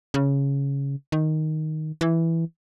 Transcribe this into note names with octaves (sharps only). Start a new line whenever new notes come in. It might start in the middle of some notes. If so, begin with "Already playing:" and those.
C#3
D#3
E3